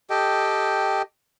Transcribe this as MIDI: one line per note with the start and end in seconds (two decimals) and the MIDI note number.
0.10 1.02 67
0.10 1.02 69
0.10 1.02 75
0.10 1.02 79